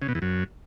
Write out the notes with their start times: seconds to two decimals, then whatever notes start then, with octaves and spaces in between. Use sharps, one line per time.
0.02 C#3
0.08 B2
0.15 E2
0.22 F#2